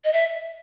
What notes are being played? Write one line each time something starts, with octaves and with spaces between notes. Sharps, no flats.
D#5
E5